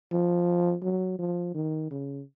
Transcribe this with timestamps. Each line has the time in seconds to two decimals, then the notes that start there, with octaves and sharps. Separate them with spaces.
0.12 F3
0.83 F#3
1.19 F3
1.54 D#3
1.91 C#3